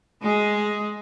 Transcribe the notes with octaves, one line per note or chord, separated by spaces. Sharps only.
G#3 G#4